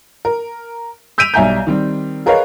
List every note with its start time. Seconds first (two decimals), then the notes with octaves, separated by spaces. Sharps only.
0.25 A#4
1.18 E6 G6 B6 D7 D#7 F7
1.34 B1 G3 E5 G#5 A#5 G6
1.67 D#3 G3 C4
2.26 G#4 A#4 B4 C#5 D#5 F5